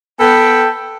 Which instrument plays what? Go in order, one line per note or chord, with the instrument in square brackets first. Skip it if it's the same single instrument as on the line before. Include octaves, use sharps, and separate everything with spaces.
[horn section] B3 A4 G5